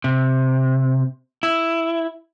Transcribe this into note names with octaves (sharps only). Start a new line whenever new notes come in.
C3
E4